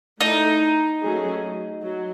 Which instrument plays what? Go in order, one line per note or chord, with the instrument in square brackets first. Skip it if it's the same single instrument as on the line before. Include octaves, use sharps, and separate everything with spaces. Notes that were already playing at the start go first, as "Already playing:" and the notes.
[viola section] A3 E4 A4 D#5 [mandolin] D#4
[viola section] F#3 A3 C#4 G#4
F#3